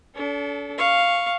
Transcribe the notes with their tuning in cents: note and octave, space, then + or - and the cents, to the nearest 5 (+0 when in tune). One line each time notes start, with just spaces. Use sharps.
D4 -45 A4 -15
F5 +0 C#6 +0